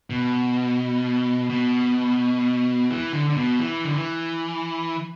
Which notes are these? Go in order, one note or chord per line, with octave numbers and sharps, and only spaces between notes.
B2
B2
E3
D3
D3
B2
E3
D3
E3